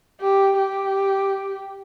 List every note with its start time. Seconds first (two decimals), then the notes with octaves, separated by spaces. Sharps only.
0.21 G4
0.58 G4